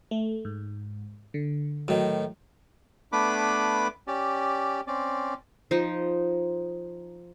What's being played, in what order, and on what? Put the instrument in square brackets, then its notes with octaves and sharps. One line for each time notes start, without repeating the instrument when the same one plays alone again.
[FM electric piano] A3
G#2
D3
[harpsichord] A2 D#3 [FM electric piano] F#3
[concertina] A3 B3 D4 B4 B5 D6
C#4 G4 D5
C4 C#4 D5
[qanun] F3 D#4